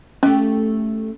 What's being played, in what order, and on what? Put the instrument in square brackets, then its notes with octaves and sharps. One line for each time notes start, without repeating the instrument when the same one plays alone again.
[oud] A3 G4 [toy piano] C#4